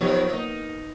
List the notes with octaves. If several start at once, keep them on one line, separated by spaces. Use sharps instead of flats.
D#3 F3 F#3 B3 D#4 G4
A#3 D#4